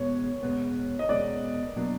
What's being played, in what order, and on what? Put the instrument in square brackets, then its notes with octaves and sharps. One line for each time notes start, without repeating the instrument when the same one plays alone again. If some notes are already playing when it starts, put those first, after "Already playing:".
Already playing: [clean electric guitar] E2 B2 G#3 B3 [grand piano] C#5
[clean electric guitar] E2 B2 G#3 B3
[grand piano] D#5
[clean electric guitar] E2 B2 G#3 B3 [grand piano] D5
[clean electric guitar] B2 F#3 A#3 D4